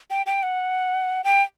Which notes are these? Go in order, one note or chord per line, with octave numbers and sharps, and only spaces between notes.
G5
G5
F#5
G5